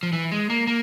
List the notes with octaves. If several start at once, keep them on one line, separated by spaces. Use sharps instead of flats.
F3
E3
G#3
A#3
A#3